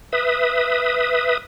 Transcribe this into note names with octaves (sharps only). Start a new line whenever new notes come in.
B4 E5 D#6